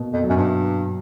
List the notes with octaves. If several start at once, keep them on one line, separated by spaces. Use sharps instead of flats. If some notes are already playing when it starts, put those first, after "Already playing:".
Already playing: B2 A#3
F2
F#3
F#2
G2